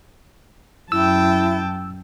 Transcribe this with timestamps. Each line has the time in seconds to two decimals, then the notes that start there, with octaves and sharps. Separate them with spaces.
0.92 F#2 E4 G5 A5 E6